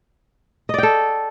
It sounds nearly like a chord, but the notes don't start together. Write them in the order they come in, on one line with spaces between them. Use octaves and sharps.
D#5 D5 G5 A4